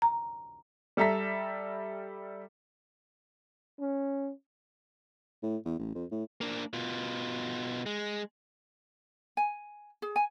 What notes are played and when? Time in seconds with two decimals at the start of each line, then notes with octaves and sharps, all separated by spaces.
0.02 A#5
0.97 G3 A4 E5 A#5 B6
3.80 C#4
5.43 A2
5.65 E2
5.79 A1
5.95 F2
6.11 A2
6.41 A#3 D4
6.74 B2 F4
7.86 G#3
9.37 G#5
10.02 G#4
10.16 G#5